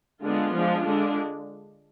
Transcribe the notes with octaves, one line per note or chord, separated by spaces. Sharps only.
D3 G#3 B3 D4 F4
F3 G#3 D4
D3 G#3 D4